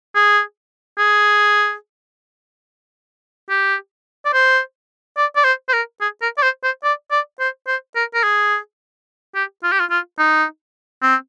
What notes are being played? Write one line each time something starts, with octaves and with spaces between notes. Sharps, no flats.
G#4
G#4
G4
D5
C5
D5
D5
C5
C5
A#4
G#4
A#4
D5
C5
C5
D5
D5
C5
C5
A#4
A#4
G#4
G4
F4
G4
F4
F4
D#4
C4